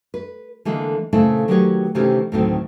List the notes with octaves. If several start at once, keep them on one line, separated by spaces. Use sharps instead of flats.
B4
D3 E3 G#3 A#3
A#2 C#3 A3 C4 E4 A4
D#3 F#3 G4 G#4 B4 C#5
C3 D#3 E3 A3 C#4 G4
D2 A2 D#3 E3 F#3 C4